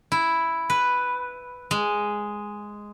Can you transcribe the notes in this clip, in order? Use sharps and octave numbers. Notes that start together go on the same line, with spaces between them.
E4
B4
G#3